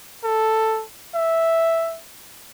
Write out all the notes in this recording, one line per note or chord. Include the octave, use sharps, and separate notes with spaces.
A4
E5